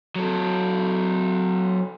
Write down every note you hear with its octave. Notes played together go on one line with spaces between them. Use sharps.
F#3 A4